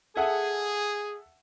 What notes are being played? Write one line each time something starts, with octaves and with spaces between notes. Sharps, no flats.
G#4 A4 E5 F#5